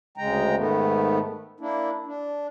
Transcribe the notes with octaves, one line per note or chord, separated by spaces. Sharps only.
D2 C#3 G#3 G5 A#5
G#2 D#3 A3 B3
A#3 D4 E4
D4